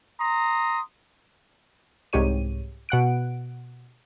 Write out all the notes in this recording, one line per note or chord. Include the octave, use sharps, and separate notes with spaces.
A#5 C6 D#6
C2 G#2 G4 C#5 D#7
B2 F#5 F#6 D7